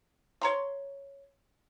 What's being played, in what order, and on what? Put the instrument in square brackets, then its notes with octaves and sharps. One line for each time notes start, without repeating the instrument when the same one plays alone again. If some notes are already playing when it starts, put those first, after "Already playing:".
[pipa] C#5 A#5 C6